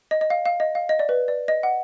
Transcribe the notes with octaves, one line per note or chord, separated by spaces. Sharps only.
D#5
D#5
F5
F5
D#5
F5
D#5
D5
B4
D5
D#5
F#5